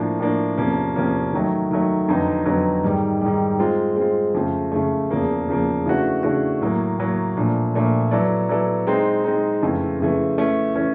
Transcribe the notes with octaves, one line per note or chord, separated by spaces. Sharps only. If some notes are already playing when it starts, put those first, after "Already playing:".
Already playing: A2 F3 A#3 D4
A2 F3 A#3 D4
E2 C3 F3 A#3 C#4
E2 C3 F3 A#3 C#4
D#3 F#3 A3
D#3 F#3 A3
F2 D3 F#3 B3 D#4
F2 D3 F#3 B3 D#4
G#2 D#3 G3
G#2 D#3 G3
G#3 C4 F4
G#3 C4 F4
F2 C#3 F3 A3
F2 C#3 F3 A3
E2 C#3 F3 A#3
E2 C#3 F3 A#3
C#3 E3 A3 D4 F#4
C#3 E3 A3 D4 F#4
A2 F#3 A#3
A2 F#3 A#3
A#2 F3 A3 D4
A#2 F3 A3 D4
F#3 B3 E4 A4 D5
F#3 B3 E4 A4 D5
G#3 C4 D#4
G#3 C4 D#4
F2 C#3 E3 A3
F2 C#3 E3 A3
E3 A3 C#4
E3 A3 C#4